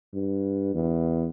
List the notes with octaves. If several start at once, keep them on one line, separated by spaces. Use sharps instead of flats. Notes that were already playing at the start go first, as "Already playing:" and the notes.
G2
E2